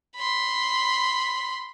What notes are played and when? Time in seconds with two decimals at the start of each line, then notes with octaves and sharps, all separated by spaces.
0.16 B5 C6